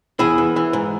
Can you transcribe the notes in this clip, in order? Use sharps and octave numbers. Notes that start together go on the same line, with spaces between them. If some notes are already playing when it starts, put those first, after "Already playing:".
E2 E4 G#4
E3
E3
G#2